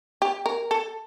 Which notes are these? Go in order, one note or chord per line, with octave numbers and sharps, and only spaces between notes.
G4
A#4
A4